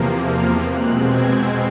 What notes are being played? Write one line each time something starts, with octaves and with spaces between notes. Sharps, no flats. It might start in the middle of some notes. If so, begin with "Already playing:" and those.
Already playing: E2 C3 F3 A#3
F6
B2 G#3 C4 F#6
G#6